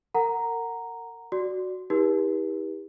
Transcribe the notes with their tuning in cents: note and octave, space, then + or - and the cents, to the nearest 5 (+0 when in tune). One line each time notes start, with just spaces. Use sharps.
A#4 -30 F#5 +0 A#5 +0
F#4 +0 D5 +0
E4 -45 G4 +25 B4 -45